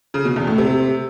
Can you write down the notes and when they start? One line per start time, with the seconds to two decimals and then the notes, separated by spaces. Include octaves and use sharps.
0.14 C#3
0.25 B2
0.36 E2
0.47 A2
0.58 C3